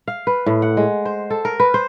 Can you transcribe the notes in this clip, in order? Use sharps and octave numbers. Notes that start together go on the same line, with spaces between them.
F5
B4
A2
F#5
G#3
C5
A4
A#4
B4
C5